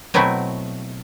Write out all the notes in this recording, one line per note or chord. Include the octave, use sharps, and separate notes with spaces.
B2 F#3 A3 C4 E4